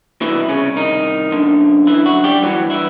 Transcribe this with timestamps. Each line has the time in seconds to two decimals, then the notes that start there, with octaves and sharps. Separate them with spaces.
0.21 C2 B2 E3 E4
0.49 C#3 C#4
0.76 D#3 D#4
1.32 F#2 D3
1.87 E3 E4
2.06 F#3 F#4
2.24 G3 G4
2.42 G2 E3 F#3 F#4
2.70 E3 E4